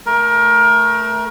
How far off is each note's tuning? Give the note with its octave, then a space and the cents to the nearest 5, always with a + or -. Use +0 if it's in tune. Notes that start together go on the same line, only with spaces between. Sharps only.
A3 +0 A#4 +25